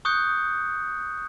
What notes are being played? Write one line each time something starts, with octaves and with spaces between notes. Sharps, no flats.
C#6 D#6 F#6 G6 C#7